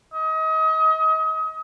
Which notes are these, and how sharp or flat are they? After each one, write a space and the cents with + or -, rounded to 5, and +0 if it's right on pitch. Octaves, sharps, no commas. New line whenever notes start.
D#5 +35